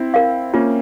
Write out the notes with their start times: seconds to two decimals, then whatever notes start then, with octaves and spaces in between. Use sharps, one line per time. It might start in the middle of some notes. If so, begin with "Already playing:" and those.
Already playing: C4 E4
0.14 A#4 F5
0.54 A#3 C#4 F4